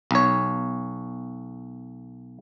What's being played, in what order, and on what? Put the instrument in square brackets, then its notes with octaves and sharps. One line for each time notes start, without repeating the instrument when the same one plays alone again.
[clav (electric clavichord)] B1 C#5